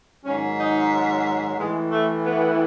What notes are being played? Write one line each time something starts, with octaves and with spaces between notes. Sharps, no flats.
G#2 D#3 F#3 C#4
D#4
A2 E3 G#3
A3
B3